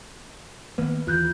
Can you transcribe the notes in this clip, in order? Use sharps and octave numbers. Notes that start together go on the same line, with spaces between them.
D#3 A#3 B3 B4
D#2 E3 F4 F#6 G6